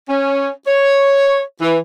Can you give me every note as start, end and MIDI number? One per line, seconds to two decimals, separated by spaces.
0.09 0.49 61
0.67 1.40 73
1.61 1.77 52